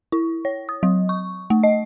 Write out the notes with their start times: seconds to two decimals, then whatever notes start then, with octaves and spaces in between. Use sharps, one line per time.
0.12 E4
0.45 C#5
0.69 D#6
0.83 F#3
1.09 C#6
1.50 A3
1.63 D#5